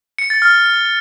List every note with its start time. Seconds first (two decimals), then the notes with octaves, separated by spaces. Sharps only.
0.18 C#7
0.30 A6
0.42 F6